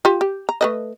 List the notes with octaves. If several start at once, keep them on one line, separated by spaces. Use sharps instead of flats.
F4 G4
G4
A#5
A3 B4 D#5